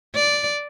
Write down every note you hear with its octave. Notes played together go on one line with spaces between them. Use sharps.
D5